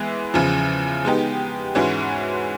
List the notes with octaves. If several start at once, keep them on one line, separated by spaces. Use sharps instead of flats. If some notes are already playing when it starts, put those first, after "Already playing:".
Already playing: E3 G#3 B3
E2 C#3 F3
G#3 B3 D#4 G4
G#2 E3 G#3 C#4 F#4